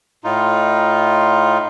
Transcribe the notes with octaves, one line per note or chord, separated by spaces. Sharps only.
A2 D#4 F4